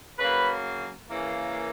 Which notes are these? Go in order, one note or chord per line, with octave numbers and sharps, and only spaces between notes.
C#3 F#3 A#3 B4
C#3 E3 A#3